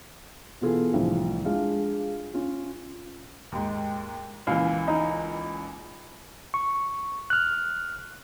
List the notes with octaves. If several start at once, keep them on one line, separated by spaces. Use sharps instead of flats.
B2 E3 B3 F4 G#4 A4
C2 A2 E3 F3
G#3 D4 F4 F5
C#4 F4
D#2 G#2
C#2 A#2 E3 F5
D#4
C#6
F6 F#6